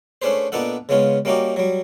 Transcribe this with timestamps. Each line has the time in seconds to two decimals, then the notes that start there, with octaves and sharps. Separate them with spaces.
0.22 A3 C#4 D4 G#4 B4 C5
0.52 A#2 B3 D4 D#4 A4 F#5
0.89 C#3 G#3 B3 C#4 F4
1.25 G3 A#3 C#4 D#4 F#4 G4
1.56 F#3 G3